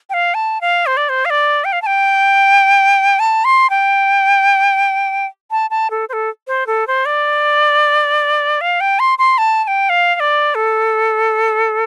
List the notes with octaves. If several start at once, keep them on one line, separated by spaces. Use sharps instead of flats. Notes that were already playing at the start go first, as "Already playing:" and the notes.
G5
F5
A5
F5
C5
D5
C5
F5
D5
G5
F5
A5
G5
A5
C6
G5
A5
A5
A4
C5
A4
C5
A4
C5
D5
F5
G5
C6
C6
A5
A5
G5
F5
F5
D5
A4